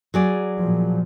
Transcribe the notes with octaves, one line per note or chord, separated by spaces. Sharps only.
F#3 G#4 D5
A#2 F3